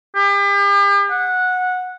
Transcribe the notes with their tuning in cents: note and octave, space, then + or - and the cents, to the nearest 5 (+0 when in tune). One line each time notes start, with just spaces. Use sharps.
G4 +40
F#5 -15